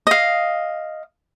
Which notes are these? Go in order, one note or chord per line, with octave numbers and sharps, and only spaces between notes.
D#5 F5